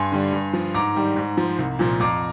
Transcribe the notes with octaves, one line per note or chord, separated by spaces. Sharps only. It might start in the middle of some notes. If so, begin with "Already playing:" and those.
Already playing: G2 G#5 C6
D3 G3
G2
F3
G#2 A#5 D6
D#3 G3
G#2
F3
C2
A#2 F3
F2 A#5 D6